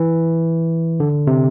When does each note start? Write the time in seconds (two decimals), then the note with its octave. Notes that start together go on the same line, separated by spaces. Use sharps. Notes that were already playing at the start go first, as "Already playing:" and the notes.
Already playing: E3
1.00 D3
1.27 C3